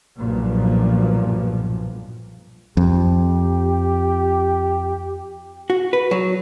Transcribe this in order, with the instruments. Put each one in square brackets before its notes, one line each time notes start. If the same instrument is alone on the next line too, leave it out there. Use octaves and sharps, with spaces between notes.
[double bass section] B1 G2 A#2 F3
[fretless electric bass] F2 [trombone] G4
[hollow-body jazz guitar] F#4
B4
F#3